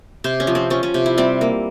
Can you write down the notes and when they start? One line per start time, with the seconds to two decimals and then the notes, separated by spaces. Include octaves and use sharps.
0.24 C3 C5
0.40 C#4
0.47 F3
0.55 C4
0.70 F3 C#4
0.83 C#4
0.94 C3
1.06 E4
1.18 G3 C4
1.41 A#3